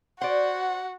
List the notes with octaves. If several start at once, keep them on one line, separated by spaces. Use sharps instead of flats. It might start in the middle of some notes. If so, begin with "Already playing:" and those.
F#4 C5 D5 F#5